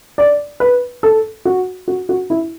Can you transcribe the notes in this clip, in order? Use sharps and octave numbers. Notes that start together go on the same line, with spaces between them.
D5
B4
A4
F#4
F#4
F#4
E4